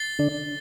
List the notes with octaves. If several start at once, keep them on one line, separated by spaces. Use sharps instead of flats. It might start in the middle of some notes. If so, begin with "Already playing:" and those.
Already playing: A6 C7 G7
D3 D4